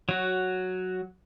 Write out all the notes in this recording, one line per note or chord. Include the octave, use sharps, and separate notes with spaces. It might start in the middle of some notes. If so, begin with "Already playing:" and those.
F#3 F#4